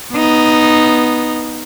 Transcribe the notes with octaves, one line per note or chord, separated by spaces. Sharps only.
B3 D#4